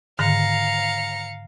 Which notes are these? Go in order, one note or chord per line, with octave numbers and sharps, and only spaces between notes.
G#2 D3 D#3 F5 A#5 C#7